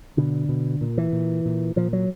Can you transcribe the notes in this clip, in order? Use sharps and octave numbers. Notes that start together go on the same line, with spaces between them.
B2 D3
B2
A#2
E3
A#2
A#2
A#2 F3
F#3